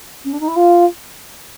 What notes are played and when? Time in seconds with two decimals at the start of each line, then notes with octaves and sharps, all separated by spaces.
0.25 C#4
0.33 D4
0.40 D#4
0.48 E4
0.56 F4